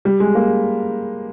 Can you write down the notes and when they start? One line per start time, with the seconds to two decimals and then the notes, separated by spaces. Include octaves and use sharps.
0.05 G3
0.20 G#3
0.35 A#3